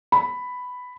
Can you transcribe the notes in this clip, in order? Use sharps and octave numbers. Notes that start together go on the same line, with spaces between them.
B5